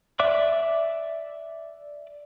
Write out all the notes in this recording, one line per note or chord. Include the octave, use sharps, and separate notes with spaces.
D5 E5 D6 F#6